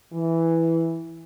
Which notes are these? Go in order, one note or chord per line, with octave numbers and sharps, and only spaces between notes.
E3